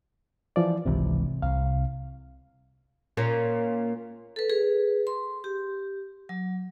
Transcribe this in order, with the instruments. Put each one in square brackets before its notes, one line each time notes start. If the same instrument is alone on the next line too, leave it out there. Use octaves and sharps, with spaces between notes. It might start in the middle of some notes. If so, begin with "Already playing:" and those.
[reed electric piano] E3 F3 D5
[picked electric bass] G#1 C#2 E3 [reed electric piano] C3
[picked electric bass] C2 [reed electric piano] F5
[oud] A#2 A#3 C#4
[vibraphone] A4 B4
G#4 B4
C6
G4
F#3